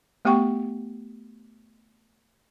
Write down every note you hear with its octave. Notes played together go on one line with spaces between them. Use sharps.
A3 B3 G4 F#5 G5 C#6